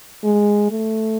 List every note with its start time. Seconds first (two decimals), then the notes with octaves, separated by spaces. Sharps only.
0.24 G#3
0.71 A3